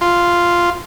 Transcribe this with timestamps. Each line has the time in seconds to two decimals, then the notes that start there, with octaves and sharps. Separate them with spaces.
0.01 F4